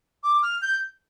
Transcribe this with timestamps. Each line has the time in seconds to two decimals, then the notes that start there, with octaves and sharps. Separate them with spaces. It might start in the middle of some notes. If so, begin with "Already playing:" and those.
0.23 D6
0.43 F6
0.62 G6